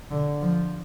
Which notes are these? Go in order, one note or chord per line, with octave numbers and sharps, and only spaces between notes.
D3
F3